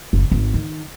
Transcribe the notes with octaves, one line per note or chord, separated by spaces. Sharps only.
F#1
G#1
D#3